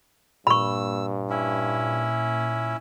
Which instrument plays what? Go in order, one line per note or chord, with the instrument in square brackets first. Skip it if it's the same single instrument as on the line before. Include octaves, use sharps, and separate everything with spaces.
[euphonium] G2 [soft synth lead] A#2 [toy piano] B5 C#6 [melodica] E6
[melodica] C#4 E4